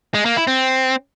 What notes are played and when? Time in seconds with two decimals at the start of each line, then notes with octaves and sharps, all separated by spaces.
0.14 G#3
0.25 A#3
0.36 E4
0.47 C4